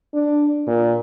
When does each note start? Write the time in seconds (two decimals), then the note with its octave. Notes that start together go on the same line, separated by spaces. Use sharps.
0.14 D4
0.67 A#2